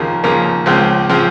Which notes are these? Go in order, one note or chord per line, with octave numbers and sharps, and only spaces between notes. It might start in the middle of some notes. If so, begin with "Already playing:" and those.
Already playing: D#2 C#3 F3 A#3
D#2 C#3 F3 A#3
C#2 C#3 F3 C4
C#3 F3 C4